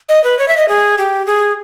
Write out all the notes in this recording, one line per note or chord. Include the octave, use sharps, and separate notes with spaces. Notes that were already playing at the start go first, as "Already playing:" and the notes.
D#5
B4
C#5
E5
D#5
G#4
G4
G#4